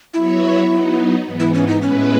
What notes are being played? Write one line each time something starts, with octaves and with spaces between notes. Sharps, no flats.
F#3 B3 E4 F#4 C#5 E5
F#3 B3 D#4
G#2 E3 B3
E4
C#4
D#4
A2 G#3 B3 C#4 E4 B4